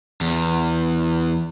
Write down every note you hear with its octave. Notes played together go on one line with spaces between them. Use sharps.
E2